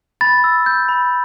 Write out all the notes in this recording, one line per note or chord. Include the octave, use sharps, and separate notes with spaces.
B5 A6
E6
G6
B5